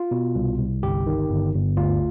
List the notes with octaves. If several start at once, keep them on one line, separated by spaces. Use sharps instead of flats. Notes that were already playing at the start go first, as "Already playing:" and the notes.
Already playing: F4
B2
C2
C2
G1 G4
D#3
G1
G1
D2 F4